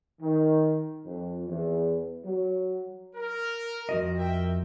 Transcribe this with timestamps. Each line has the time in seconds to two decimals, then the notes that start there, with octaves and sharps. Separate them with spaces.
0.21 D#3
1.05 F2
1.47 E2
2.24 F#3
3.16 A#4
3.89 F2 F#4 D#5
4.17 A#4 E5 G5